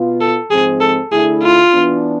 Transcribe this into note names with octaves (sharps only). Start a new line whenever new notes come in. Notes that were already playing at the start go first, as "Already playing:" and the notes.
Already playing: B2 B3 F4
A4
G#2 F3 G#3 C4 G#4
A4
D3 A3 E4 G#4
F4
E3 B3 D4